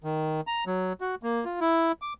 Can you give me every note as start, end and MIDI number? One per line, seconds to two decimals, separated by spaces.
0.04 0.41 51
0.47 0.64 82
0.67 0.93 54
1.01 1.15 66
1.23 1.45 58
1.45 1.60 65
1.61 1.92 64
2.02 2.13 86